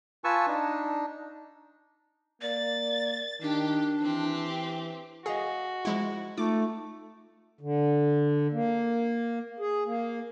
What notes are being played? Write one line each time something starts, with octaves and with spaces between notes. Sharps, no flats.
F4 B4 G#5 A5 C#6 E6
D4 D#4
A#3 D5 A6
D#3 D4 G4
E3 C4 G4
F#4 G#4 D#5 F5 G#5
F3 G#3 E4
A3 D#4 F4 D6
D3
A#3
G#4
A#3